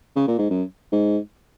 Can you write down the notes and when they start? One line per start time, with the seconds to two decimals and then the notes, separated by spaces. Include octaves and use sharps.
0.16 C#3
0.27 A#2
0.39 G#2
0.50 F#2
0.92 G#2